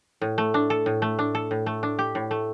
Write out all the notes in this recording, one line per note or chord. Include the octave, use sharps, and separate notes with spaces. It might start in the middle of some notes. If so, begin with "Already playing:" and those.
A2
A3
D4
A4
A2
A3
D4
A4
A2
A3
D4
G4
A2
A3